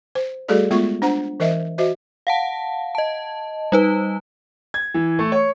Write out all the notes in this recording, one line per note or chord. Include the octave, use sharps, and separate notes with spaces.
C5
G3 A3 F#4 G#4 A4 D5
G#3 A3 B3 F4 C#6
D4 C5 F#5 A#5
E3 A#4 C5 D#5 E5
F#4 C5 D#5 E5
F5 F#5 A5
D#5 A5
G3 D#4 B4
G#6
E3
A3
C#5